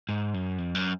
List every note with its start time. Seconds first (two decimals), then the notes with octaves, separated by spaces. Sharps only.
0.09 G#2
0.34 F#2
0.58 F2
0.75 F#2